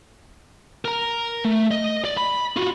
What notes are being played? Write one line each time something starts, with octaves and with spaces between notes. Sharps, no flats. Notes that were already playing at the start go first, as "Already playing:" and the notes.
A#4 A#5
A3
D#5
D5
B5
F4 F#4